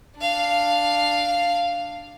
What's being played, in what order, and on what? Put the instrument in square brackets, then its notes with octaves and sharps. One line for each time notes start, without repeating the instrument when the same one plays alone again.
[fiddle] D4 F5